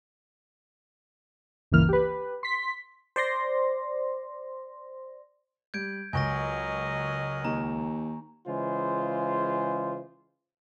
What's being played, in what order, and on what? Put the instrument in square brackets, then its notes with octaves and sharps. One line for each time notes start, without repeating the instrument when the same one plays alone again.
[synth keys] G1 C#2 E3 A#3 F6
G4 B4
C6 B6
[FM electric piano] C5 D5 C6 A#6
[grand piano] G3 [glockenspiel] G6 G#6 D7
[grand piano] C#2 [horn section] F#3 A#4 D#5 [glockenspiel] G#5 C#6 A#6
[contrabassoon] D#2 [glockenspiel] A#5
[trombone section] C#3 E3 G#3 F4 C5